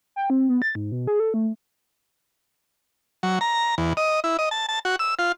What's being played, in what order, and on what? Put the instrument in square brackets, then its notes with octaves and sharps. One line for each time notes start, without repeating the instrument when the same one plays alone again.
[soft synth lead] G5
C4
B3
A6
G#2
B2
G#4
A4
A3
[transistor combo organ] F#3
A#5
E2
D#5
E4
D#5
A5
A5
F#4
E6
F4